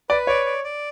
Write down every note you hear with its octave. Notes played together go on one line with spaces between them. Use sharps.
B4 D5
C#5 D5
D5
D5